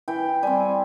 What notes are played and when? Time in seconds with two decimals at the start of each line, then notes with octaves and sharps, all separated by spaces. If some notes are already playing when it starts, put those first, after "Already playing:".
0.08 E3 G5
0.43 G3 C4 G#5